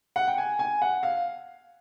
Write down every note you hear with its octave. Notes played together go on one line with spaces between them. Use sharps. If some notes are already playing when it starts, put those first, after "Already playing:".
F#5
G5
G#5
G#5
F#5
F5